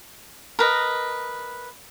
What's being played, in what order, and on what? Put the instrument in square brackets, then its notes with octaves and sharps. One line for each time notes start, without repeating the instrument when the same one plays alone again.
[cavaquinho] A#4 B4 D#5